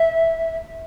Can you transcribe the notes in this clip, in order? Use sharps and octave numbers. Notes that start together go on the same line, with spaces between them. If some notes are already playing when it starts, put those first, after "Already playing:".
Already playing: E5